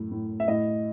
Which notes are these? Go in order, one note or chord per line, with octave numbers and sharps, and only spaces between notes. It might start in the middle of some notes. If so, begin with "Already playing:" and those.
Already playing: F#2 A2
A2
E5
A2 D#5